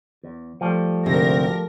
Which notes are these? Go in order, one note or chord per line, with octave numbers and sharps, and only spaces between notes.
E2
F3 G3 A3
D2 G#2 C3 A#4 A#6